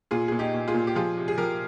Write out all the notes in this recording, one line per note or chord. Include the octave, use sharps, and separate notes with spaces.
A#2 F4 G#4
A#2 G#4
D#4 G4
A#2
F4 G#4
A#2
G4
F3 F4 G#4
C3
G#4
F3 G4 A#4